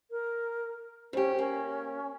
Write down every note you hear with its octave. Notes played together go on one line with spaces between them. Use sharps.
A#4
F2 C#4 G4
A#3 C#4